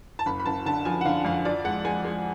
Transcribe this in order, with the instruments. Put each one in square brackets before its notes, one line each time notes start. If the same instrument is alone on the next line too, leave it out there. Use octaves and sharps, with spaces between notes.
[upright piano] A5
F#1 B5
B5
F#1 A5
D3 A5
F3 G#5
F#5
D3 F5
F2 F5
F3 D5
G#3 F#5
G#3 G#5
G#3